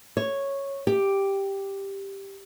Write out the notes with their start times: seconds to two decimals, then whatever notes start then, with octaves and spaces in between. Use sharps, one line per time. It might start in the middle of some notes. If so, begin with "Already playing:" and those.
0.17 C#5
0.87 G4